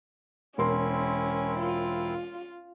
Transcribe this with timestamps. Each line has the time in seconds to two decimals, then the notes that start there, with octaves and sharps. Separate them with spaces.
0.58 E1 C4 C#4 E4 A#4 C6
1.60 F4